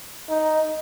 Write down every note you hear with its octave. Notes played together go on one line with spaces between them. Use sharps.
D#4